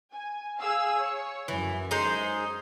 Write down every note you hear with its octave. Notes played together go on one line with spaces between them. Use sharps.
G#5
G#4 F5 E6
C#5
F#2 E3
G#3 D#4 C5